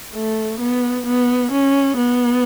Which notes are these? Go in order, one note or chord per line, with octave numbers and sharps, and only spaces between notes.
A3
B3
B3
C#4
B3